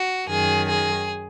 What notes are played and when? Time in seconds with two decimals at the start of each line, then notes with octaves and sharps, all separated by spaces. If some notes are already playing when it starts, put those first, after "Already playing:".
Already playing: F#4
0.29 F#2 D#3 G#4
0.68 G#4